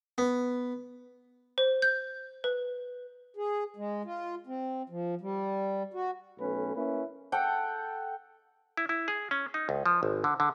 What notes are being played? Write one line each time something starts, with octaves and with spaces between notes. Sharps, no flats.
B3
C5
G6
B4
G#4
G#3
F4
C4
F3
G3
F#4
B1 A3 C#4 B4
A#3 C#4 E4 B4
A4 F#5 G5
E4
E4
G#4
C#4
D#4
C#2
F3
G#1
D3
D3